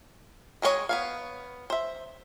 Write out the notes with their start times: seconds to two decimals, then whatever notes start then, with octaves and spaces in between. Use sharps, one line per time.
0.62 D#3 G#3 C4 C#5 D#5
0.89 B3 C#5 F5
1.70 C5 E5